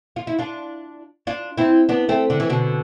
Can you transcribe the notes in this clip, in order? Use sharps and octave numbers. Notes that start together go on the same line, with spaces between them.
F4
E4
D4 F4
D4 F4
C4 E4
B3 D4
A3 C4
D3
E3
B2 D3